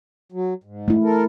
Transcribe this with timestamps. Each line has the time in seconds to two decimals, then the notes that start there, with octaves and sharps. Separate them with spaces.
0.32 F#3
0.64 G#2
0.88 A3 E4
1.03 A4 A#4